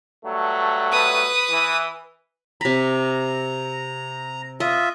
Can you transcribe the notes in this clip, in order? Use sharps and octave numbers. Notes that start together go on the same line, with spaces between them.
G2 F#3 A3
B4 D#6
E3
C3 A#5 B5
F4 D#5 E5